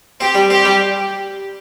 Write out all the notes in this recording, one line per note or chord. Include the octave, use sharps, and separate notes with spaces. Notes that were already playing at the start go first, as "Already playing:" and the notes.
C4 G4
G3
C4 G4
G3